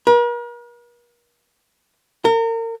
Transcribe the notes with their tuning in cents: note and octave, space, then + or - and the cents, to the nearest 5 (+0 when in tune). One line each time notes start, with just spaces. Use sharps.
A#4 +45
A#4 -35